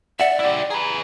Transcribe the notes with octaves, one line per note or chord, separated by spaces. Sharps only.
D5 E5 F#5
E4 G4
G#4 B4 A#5